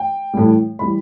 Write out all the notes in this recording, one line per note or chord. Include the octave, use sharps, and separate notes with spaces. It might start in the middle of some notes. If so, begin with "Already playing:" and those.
Already playing: G5
A2 E3 G3
E3 G3 B5